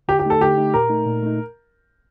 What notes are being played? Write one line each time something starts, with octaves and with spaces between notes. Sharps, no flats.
D3 G4
G4
A3 D#4 A4
D3 G4
A3 D#4
A#2 A#4
A3 D#4
A#2
A3 D#4